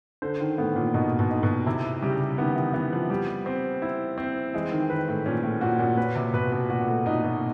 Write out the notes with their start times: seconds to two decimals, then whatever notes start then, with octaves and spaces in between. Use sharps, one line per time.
0.22 D3 C5
0.41 D#3
0.58 A2 B3
0.76 A#2
0.94 B2 D#4
1.19 B2
1.30 D#4
1.43 B2
1.66 C3 E4
2.02 C#3 G3
2.38 D#3 B3
2.56 E3
2.73 E3 B3
2.92 F3
3.10 G3
3.46 C4
3.82 E4
4.18 C4
4.54 E3 G#3
4.72 D#3
4.90 D#3 B4
5.08 A2
5.26 A#2 C#4
5.43 A2
5.61 A#2 F#4
5.79 A#2
5.97 A#2 B4
6.15 C3
6.33 B2 B4
6.52 B2
6.69 A#2 F#4
6.81 A#2
6.87 A2
7.06 A#2 D#4
7.24 B2